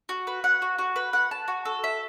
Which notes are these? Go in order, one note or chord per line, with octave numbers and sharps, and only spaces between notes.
F#4
B4
F#5
F#4
F#4
B4
F#5
A5
F#4
A4
E5